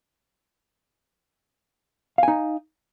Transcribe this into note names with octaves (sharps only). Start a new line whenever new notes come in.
D#4 F5 G#5